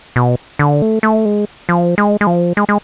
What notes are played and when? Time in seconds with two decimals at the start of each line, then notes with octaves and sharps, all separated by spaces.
0.16 B2
0.59 D3
0.82 A3
1.03 A3
1.25 G#3
1.69 F3
1.98 G#3
2.21 G#3
2.27 F3
2.57 G#3
2.69 G#3